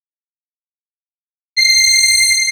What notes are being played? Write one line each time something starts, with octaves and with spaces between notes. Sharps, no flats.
C7